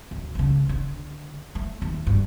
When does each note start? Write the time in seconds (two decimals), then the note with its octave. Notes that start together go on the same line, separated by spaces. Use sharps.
0.11 D2
0.35 C#2 C#3
0.69 D3
1.55 A3
1.82 D#2
2.07 G2